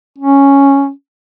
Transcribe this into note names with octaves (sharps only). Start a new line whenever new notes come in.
C#4